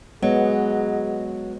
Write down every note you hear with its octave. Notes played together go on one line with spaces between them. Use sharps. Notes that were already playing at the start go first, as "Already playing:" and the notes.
F#3 G#3 B3 G#4 D#5